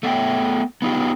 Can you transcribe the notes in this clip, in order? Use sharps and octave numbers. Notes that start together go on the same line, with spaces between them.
A3 B3 E5 G5
B3 D#4 F4 G4